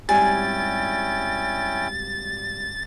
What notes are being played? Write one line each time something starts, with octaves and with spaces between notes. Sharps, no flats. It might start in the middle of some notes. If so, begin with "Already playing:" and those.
G#1 G3 C#4 E4 G5 G#5 A6